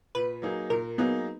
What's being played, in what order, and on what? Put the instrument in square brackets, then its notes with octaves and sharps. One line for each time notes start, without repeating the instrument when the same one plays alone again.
[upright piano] A#2 [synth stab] B4
[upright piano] F#3 A#3 D#4 G#4
[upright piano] A#2 [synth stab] A#4
[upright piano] F#3 A#3 D#4 G#4 [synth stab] B3